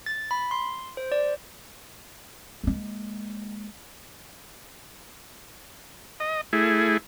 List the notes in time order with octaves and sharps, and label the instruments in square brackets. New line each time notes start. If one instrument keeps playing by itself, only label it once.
[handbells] A6
B5
C6
C5
D5
[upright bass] G#3 A#3
[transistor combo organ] D#5
A3 E4 G#4